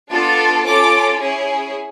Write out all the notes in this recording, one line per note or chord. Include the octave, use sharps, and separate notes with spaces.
B3 D4 F4 A4
C#4 F4 A4 D6
C#4 E4 G#4